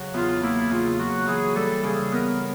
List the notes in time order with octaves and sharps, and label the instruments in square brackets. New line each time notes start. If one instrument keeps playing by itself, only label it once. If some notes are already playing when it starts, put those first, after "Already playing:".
Already playing: [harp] C#3 F#3
[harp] E2 [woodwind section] F4
[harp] A#3 [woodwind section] E4
[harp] C#3 [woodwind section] F4
[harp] F#3 [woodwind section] F#4
[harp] E3 [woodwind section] G#4
[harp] G3 [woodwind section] A4
[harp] C#3 [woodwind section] G#4
[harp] B3 [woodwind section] A#4